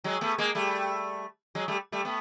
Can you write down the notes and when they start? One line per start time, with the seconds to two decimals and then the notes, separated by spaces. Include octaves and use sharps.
0.04 F#3 G#3
0.21 A3 B3
0.38 G#3 A#3
0.55 G3 A3
1.55 F#3 G#3
1.68 G3 A3
1.92 G3 A3
2.05 A3 B3